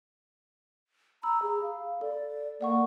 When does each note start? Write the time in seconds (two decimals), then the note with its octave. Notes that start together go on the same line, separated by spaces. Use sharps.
1.23 A#5 B5 E6
1.42 G#4
1.63 F5
2.01 A4 D5
2.61 A#3 D5 F#5 C#6